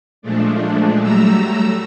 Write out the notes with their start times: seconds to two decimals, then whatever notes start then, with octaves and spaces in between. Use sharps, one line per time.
0.22 A#2 F3 G#3 A3 D4
1.02 F#3 G3 A3 A#5 E6